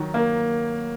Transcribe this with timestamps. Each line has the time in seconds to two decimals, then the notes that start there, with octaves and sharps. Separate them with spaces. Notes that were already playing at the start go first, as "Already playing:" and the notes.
Already playing: D#3 F#3
0.14 A#3